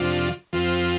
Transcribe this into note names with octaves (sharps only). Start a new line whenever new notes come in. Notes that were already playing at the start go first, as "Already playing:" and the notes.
Already playing: F2 C3 F3 D4 F4
F2 F3 C4 F4